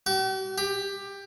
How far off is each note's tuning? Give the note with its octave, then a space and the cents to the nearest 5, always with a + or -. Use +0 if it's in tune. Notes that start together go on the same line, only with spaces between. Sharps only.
G4 -45
G4 +15